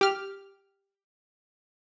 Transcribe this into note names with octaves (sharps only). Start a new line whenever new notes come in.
G4 F6